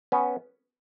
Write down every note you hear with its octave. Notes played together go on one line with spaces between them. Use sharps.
B3 C#4